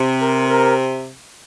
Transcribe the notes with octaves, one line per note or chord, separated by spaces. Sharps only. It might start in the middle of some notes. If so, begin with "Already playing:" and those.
Already playing: C3
A#4
A#4